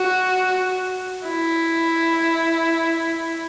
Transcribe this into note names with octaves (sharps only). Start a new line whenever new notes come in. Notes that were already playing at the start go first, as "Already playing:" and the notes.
Already playing: F#4
E4